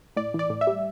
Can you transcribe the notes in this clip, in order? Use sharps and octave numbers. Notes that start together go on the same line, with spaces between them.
A2 D5
E3
D5
A2
E5
G3